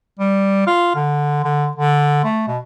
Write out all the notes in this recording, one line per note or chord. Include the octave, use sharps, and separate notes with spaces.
G3
F4
D3
D3
D3
A3
B2